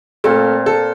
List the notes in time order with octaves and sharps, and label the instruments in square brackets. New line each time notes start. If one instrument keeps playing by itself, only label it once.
[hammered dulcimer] A#2 C4 F4 [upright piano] A3 A4
[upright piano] A4